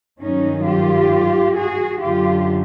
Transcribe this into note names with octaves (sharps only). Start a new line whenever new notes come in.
G2 D#3 F#3 C#4 D#4
F4 G4
F#4 G#4
F#2 D3 F#3 F4 G4